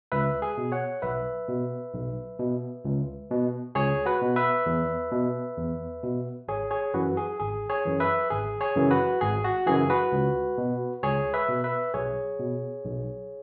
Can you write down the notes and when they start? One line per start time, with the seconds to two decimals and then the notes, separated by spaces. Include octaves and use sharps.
0.12 C#2 B4 E5
0.42 G#4
0.58 B2
0.72 C#5 F#5
1.02 B1 B4 E5
1.48 B2
1.93 B1
2.39 B2
2.85 C#2
3.31 B2
3.75 C#2 G#4 C#5
4.06 F#4 B4
4.21 B2
4.36 B4 E5
4.66 E2
5.12 B2
5.58 E2
6.04 B2
6.48 G#1 G#4 C#5
6.71 G#4 C#5
6.94 F#2 E3 F#4 B4
7.17 G#4
7.39 G#1 G#4
7.69 G#4 C#5
7.85 F#2 E3
8.00 B4 E5
8.30 G#1 G#4
8.61 G#4 C#5
8.75 F#2 C#3 E3
8.91 F#4 B4
9.21 G#1 G#4
9.44 F#4
9.67 F#2 C#3 E3 G#4
9.90 F#4 B4
10.12 C#2
10.58 B2
11.03 C#2 G#4 C#5
11.34 B4 E5
11.49 B2
11.64 B4 E5
11.94 B1 G#4 C#5
12.40 B2
12.85 B1